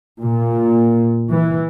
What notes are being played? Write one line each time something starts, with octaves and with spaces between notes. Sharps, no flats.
A#2
E3